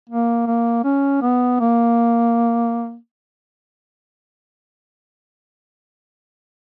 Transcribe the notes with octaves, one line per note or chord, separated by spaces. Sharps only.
A#3
A#3
C#4
B3
A#3